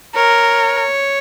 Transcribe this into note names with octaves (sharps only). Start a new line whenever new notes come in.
A#4 C#5